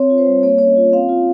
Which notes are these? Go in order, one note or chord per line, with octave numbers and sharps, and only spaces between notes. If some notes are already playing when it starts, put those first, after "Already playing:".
Already playing: C4 C#5
F4
C5
G3
A#3 C#5
C#4 C#5
D#5
F4
C4 F5
F4